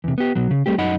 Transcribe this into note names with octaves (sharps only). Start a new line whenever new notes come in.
E2 C3
B3 G4
B2 F#3
C#3
G3 A3 C4 G4
F#2 D#4 D#5 F#5 B5